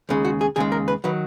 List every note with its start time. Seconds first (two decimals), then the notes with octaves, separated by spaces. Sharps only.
0.09 D#2 C#3 G#3
0.25 F#4
0.41 G#4
0.56 D#2 C#3 G#3 G#4
0.72 A#4
0.88 B4
1.04 D#3 F#3 B4